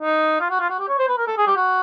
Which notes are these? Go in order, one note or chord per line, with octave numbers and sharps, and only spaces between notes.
D#4
F4
F#4
F4
F#4
G4
C#5
C5
B4
A#4
A4
G#4
G4
F#4